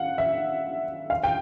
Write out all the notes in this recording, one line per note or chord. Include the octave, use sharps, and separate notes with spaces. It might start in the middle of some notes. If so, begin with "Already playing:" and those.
Already playing: F5 F#5
E5
F5
G5